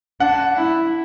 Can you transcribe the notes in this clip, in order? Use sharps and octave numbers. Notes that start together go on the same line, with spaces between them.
D4 F#5
E4